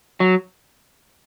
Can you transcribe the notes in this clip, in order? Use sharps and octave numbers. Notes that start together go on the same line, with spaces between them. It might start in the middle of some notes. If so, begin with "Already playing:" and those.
F#3